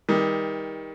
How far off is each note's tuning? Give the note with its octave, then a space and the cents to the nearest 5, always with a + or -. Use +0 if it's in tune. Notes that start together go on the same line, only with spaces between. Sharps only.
D#3 +30 G3 +35